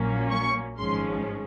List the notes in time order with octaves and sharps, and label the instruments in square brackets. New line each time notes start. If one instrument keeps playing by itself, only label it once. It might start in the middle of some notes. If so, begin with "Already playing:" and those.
Already playing: [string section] A#1 A#2 F#3 A#3 C#4
C#6
G#1 G#2 F3 G#3 C#4 C6